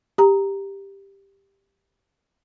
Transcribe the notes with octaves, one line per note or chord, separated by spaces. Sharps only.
G4 A#5